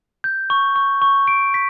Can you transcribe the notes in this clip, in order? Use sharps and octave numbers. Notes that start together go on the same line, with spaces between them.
G6
C#6
C#6
C#6
D7
B6